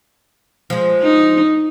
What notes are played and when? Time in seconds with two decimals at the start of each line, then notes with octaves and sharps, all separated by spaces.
0.70 F3 G#3
1.02 D#4